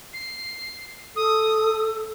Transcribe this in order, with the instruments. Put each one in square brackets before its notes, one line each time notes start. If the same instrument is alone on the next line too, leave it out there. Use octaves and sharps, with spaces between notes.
[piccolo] C7
[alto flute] A4 [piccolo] D#6